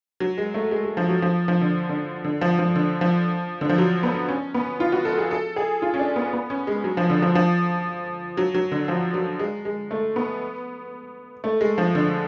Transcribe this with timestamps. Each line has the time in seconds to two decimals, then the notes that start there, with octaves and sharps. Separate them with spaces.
0.20 F#3
0.38 G#3
0.54 A3
0.71 G#3
0.84 G#3
0.97 F3
1.09 F#3
1.22 F3
1.48 F3
1.61 D3
1.89 D3
2.24 D3
2.41 F3
2.59 F3
2.76 D3
3.01 F3
3.61 D3
3.69 F3
3.78 F#3
4.03 B3
4.29 C#4
4.54 B3
4.80 F4
4.92 F#4
5.05 A4
5.18 G#4
5.31 A4
5.56 G#4
5.82 F4
5.94 C#4
5.99 D4
6.16 B3
6.33 B3
6.50 C#4
6.67 G#3
6.84 F#3
6.97 F3
7.10 D3
7.22 F3
7.35 F3
8.37 F#3
8.54 F#3
8.72 D3
8.88 F3
9.14 F#3
9.39 G#3
9.65 G#3
9.91 A3
10.16 B3
11.44 A3
11.61 G#3
11.78 F3
11.95 D3